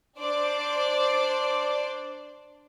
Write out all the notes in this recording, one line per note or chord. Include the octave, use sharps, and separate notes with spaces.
D4 C5 D5